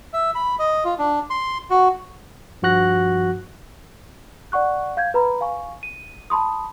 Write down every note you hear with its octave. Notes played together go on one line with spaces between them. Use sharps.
E5
B5
D#5
F4
D4
C6
F#4
G2 F3 F#4 F#6 A#6
D5 F#5 C#6 F#6
F5 G6 G#6
B4 A#5 B5
F5 G#5 C#6
D#7
A5 B5 C6 D#6